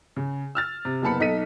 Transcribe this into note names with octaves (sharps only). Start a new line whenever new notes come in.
C#3
E6 F6 A6
C3
F#1 A#3 B3 A5 B5 C#7
B1 D#4 A4 B6 D#7